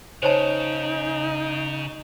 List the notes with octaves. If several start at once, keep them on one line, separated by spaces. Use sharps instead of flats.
C#3 D#4 C5 C#5 A5